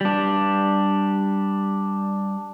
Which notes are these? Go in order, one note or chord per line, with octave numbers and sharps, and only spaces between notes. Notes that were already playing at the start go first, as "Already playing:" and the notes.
G3 D4